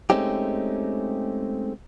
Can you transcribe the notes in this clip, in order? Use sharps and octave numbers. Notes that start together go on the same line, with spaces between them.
G#3 A3 C4 C#4 D#4 G4